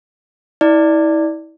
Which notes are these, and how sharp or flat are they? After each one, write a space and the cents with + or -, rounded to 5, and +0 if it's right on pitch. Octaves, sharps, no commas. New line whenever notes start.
E4 -35 D5 +0